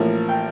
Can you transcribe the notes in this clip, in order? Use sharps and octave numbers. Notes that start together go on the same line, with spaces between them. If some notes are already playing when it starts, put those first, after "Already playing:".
Already playing: A1 A2 F3 A#3
G5